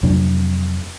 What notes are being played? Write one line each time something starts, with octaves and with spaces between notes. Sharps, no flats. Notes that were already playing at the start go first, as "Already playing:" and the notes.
F2 C3 F#3 D4